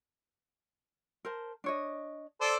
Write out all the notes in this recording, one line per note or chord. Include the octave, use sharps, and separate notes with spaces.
A#4 C5 A5
D4 C#5 D#5
A4 C5 D5